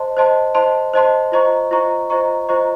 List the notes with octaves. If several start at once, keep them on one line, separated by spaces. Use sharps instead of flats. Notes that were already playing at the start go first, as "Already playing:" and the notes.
Already playing: C5 D#5 A5 C6
C5 D#5 A5 C6
C5 D#5 A5 C6
C5 D#5 A5 C6
F4 C5 D#5 A#5 C#6
F4 C5 D#5 A#5 C#6
F4 C5 D#5 A#5 C#6
F4 C5 D#5 A#5 C#6